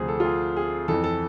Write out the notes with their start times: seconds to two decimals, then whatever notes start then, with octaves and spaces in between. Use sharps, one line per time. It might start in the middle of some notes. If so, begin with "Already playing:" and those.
Already playing: D2 C3 F3 G#4 C5
0.08 A4
0.20 F4
0.25 G#4
0.57 G#4
0.88 F2 E3 A4
1.04 A4